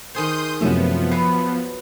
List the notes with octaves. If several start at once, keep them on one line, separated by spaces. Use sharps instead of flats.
D#3 G#4 C5 C6 D#6 G6
F#2 C3 F3 A3 B3 D#5 E5
F#3 B4 C7